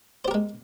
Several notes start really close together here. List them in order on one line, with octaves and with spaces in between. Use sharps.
C5 G4 A#4 G#3